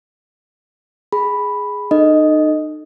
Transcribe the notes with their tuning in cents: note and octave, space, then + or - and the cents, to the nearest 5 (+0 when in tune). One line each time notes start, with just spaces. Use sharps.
G#4 +0 B5 +0
D#4 -35 A4 +0 D#5 +0